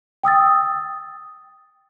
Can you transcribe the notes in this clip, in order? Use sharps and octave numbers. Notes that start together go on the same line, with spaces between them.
G5 D#6 E6 A6